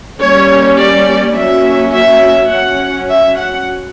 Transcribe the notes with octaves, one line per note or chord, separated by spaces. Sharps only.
G3 A#3 C#4 C#5
D5
F#3 A#3 C#4 E5
E5
F#3 C#4 F#5
E5
F#5